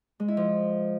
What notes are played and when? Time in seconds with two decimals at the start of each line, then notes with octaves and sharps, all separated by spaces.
0.20 G#3
0.28 E4
0.37 F3